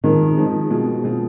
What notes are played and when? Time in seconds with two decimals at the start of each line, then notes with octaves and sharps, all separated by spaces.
0.04 G#2 D#3 F3 G#3 C4
0.37 G#2 F3 G#3 C4
0.70 B2 G#3 C4 F4
1.03 B2 G#3 C4 F4